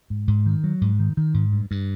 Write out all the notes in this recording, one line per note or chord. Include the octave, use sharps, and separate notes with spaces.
G#2
G#2
D#3
F#3
G#2
D#3
D#3
G#2
G2
G2